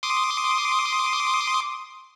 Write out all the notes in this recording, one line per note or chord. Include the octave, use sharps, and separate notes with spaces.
C6 D6 D#6